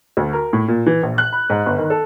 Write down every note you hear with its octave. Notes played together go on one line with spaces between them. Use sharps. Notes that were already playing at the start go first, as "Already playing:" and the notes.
D2
A#4
A2
A#2
E3
A#1
F#6
B5
G#2
G1
D#3
A4